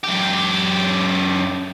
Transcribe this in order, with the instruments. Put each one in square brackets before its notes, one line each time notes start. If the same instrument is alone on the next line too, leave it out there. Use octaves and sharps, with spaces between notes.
[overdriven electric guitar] F#2 G4